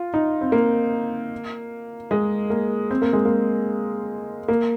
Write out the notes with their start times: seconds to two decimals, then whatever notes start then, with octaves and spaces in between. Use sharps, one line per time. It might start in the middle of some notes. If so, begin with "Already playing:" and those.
Already playing: F4
0.14 D#4
0.41 C4
0.52 A#3
2.11 G#3
2.50 A#3
2.91 C4
3.02 A#3
3.13 G#3
3.25 A#3
4.48 A#3